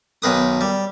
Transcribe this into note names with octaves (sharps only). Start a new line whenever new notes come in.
B1 D#3 B4 D#6
G3